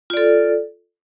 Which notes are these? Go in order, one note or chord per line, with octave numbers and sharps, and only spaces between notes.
F4 A4 D5